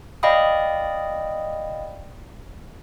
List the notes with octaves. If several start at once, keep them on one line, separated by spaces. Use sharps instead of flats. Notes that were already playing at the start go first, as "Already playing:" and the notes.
D5 D#5 F5 G5 B5 D#6